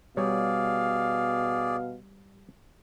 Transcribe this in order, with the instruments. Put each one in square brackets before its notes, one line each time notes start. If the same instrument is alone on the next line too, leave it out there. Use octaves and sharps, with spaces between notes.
[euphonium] B2 [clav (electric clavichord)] G3 C#5 [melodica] G#4 D5 [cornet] F5